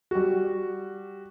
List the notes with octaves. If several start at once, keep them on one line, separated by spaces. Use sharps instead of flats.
G3 F#4